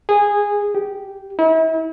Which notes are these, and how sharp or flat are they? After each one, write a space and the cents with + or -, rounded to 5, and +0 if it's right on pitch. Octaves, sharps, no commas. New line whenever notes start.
G#4 -15
G4 -10
E4 -40